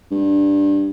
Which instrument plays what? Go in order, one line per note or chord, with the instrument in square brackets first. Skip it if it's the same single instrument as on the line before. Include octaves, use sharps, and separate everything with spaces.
[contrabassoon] G2